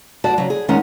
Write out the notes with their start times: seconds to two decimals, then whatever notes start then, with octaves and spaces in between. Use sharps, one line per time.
0.24 G2 F#4 D5 A5
0.38 C#3 F#3
0.50 G#4
0.68 D#3 G#3 C#4 F#5 G#5 A#5